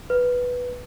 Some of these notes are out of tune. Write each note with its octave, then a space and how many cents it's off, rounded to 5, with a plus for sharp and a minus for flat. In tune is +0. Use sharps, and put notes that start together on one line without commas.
B4 -5